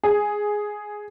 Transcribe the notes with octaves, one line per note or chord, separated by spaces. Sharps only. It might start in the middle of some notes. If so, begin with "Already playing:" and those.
G#4